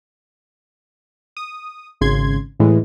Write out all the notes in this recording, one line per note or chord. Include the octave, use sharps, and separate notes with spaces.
D#6
G#1 C#3 C6 G#6
A2 E3 G#3